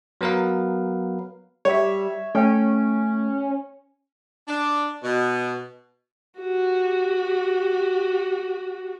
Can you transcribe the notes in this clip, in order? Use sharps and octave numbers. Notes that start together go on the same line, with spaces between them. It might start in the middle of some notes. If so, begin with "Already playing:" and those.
F#3 B3 A#4 B4 F5
G3 C#5 E5
A3 C#4 G5
D4
B2
F#4 G4